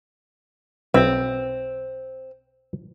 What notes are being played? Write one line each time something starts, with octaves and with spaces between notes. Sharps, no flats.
B1 C4 E4 G5